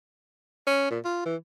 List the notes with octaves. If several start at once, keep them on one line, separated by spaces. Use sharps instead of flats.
C#4
A#2
F4
E3